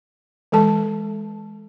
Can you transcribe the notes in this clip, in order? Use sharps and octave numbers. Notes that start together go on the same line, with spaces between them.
E3 G#3 A4 A5